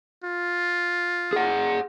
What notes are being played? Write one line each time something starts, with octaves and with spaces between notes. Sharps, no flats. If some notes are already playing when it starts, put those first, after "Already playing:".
F4
G#4 F#5